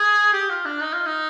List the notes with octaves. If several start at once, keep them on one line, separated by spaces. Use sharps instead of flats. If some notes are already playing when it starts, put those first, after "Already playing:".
Already playing: G#4
G4
F4
D4
D#4
F4
D#4